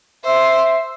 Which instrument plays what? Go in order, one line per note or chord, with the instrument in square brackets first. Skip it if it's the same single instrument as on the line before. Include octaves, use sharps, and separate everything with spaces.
[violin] C5 [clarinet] E5